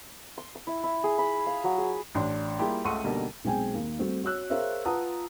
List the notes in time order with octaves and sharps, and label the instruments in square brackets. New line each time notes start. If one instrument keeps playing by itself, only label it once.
[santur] C6
E6
E4
E4
G#4
B5
F5
F#3
G#4
[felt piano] A1 D4 C6
G3 A#3 E4 F4 G4 G#4
C#2 A3 F#5 C6 C#6 D#7
B2 D3 G3 A#3 D#4 A#4
B1 G#3 C4 G5 G#5
D#2 A#3
G3 A3 C4 F#4
F#4 C#5 E6 F#6
G#4 A#4 C5 C#5 E5 F5
F4 B4 F#5 A5 A#5 D#6